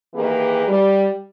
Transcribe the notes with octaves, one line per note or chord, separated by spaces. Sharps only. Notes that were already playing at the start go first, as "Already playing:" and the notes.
D#3 E3 A#3 G4 G#4 B4
G3